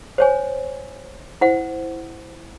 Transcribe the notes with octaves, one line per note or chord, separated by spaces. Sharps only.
C5 C#5 G#5
E4 C5 F#5